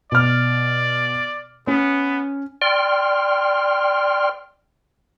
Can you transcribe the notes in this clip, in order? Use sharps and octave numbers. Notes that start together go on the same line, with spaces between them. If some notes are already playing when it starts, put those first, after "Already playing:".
B2 D5 F6
B3 C#4
D5 G5 C6 F6